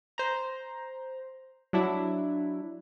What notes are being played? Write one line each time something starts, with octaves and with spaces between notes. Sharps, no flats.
C5 A#5
F#3 D4 E4